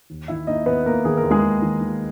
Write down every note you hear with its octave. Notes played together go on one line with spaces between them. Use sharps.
D#2
D#3 E4 E5
A#3 D#4 D#5
D#2 B3 B4
A#3 A#4
D#3 G#4
A#4
D#2
G#3 G#4
D#2
D#3
D#3